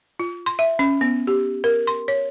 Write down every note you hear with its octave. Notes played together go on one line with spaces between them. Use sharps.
F4
C6
E5
C#4
B3
G4
A#4
C6
C#5